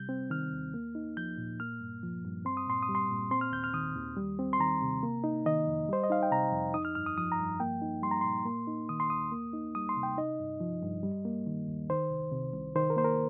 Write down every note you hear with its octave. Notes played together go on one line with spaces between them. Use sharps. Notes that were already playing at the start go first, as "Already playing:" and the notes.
Already playing: C3 G3 G6
C4
D#3 F6
D#2
A#3
D#4
F3 G6
A#2
A#3 F6
G2
F3
G2
C4 C6
D#6
A#2 C6
D#6
G3
C6
A#2
C4 C6
F6
D#2 G6
F6
D#3 D#6
D#2
G3
C4
C6
D#3 A#5
C3
A#3
D#4
D#3 D#5
F2
G3 C5
D#5
D#4 F5
G5
C3 A#5
F2
D#4 D#6
F6
G2 F6
D#6
F3 D#6
A#5
G2
A#3 G5
D#4
G3 C6
A#5
A#2 C6
A#3
D#4
D#3 D#6
C6
D#2 D#6
A#3
D#4
G3 D#6
C6
C3
G5
D#4 D#5
G2
F3
G2
G3
A#3
D#3
D#2
D#3 C5
C2
C3
C2
D#3 C5
A#4
A#3 C5
A#4